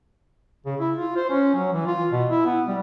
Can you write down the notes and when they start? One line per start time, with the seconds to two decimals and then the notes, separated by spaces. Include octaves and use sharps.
0.66 C#3
0.80 E4
0.96 F4
1.16 C5
1.30 C#4
1.55 F#3
1.73 E3
1.87 F4
2.12 B2
2.29 E4
2.46 B3
2.68 G3